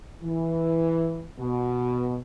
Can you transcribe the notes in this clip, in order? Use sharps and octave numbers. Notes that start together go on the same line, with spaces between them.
E3
B2